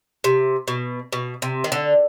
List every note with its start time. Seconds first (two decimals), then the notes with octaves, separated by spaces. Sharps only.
0.24 C3
0.68 B2
1.13 B2
1.42 C3
1.64 D#3
1.72 D3